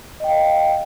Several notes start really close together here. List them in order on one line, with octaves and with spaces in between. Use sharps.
D#5 G5 F5